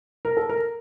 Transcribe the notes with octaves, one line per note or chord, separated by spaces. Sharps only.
A#4
A4
A#4